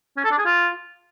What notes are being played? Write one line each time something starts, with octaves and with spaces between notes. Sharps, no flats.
C#4
A4
D4
G#4
F4